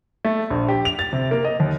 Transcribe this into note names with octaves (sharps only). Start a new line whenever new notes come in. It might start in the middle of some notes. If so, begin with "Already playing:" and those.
A3
A#1
G4
F7
A6
C3
A#3
D#5
D#2